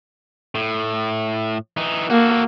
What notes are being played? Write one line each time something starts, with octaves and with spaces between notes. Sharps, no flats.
A2
E3 D#4
A#3 F#4 A4